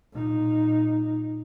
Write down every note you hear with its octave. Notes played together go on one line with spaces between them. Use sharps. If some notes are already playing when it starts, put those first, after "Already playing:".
A#2 D#4